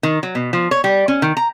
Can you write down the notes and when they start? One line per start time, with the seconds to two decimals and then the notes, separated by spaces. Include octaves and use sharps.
0.03 D#3
0.23 F#3
0.35 B2
0.53 F3
0.71 C#5
0.84 G3
1.08 C#4
1.22 D#3
1.37 A#5